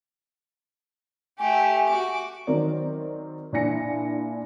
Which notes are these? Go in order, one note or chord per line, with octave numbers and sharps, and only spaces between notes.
A3 G4 G#5
F#4 D6
D#3 F#3 C4 A#4 D5
A#2 D4 E4 G#5 A#6 C#7